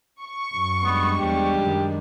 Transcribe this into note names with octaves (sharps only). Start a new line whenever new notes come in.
C#6
F#2
G3 G#3 B3 D4
E2 F3 G4
F#2 D#3